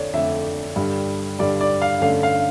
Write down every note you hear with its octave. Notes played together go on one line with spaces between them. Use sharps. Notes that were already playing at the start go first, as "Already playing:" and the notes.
Already playing: F2 D3 A3 C#5 D5
F2 D3 A3 E5
G2 D3 G3
G2 D3 G3 D5
D5
F5
G2 D3 A3 C#4 F5
F5